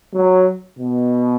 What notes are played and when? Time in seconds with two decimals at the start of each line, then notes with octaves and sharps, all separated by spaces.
0.14 F#3
0.79 B2